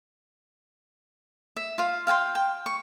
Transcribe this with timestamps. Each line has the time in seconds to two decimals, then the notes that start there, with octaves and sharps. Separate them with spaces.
1.57 E5
1.78 F4 F5
2.07 F5 G5 G#5 C6
2.35 G5
2.66 C#6